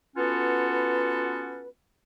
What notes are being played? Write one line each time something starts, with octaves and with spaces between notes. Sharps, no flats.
B3 C#4 F4 F#4 A4 B4